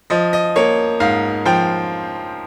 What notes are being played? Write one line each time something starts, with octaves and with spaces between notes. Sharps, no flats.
F3 D#5
D#5
A#3 C#5
G#2 F5
F3 G5